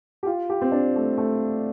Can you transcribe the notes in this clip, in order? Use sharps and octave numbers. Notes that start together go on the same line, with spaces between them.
G4
F4
G4
C4
D4
A3
A3